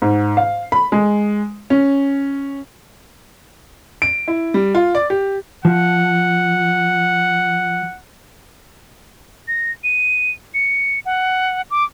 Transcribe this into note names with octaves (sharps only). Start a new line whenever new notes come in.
G#2
F5
B5
G#3
C#4
D7
E4
G3
F4
D5
G4
F3 F#5
A#6
D#7
C#7
F#5
D6